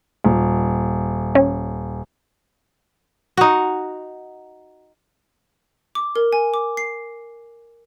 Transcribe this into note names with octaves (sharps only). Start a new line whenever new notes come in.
D#1
C#4
D#4 F#4
D6
A#4
G#5
D6
C7